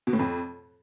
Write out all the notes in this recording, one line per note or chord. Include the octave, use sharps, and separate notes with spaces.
B2
A2
F2